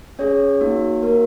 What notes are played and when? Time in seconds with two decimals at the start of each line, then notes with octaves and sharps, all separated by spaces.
0.19 C#4 G#4 C#5
0.61 A#3 D#4 F#4
1.03 A#3 F#4 A#4